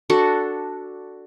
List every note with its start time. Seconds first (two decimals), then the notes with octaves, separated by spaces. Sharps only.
0.10 D4 F#4 A4